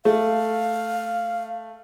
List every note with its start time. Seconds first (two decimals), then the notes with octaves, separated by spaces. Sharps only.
0.05 A3 F5